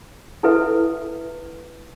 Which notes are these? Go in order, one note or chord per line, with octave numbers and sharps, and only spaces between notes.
E4 A4 B4 E5